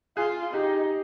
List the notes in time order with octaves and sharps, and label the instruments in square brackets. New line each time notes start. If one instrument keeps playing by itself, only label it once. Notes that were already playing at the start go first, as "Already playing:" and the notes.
[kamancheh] F4 [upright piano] G#4
[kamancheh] D#4 [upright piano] G4